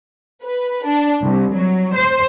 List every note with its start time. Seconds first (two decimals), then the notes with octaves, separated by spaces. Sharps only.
0.43 B4
0.84 D4
1.23 C2
1.54 F#3
1.95 C5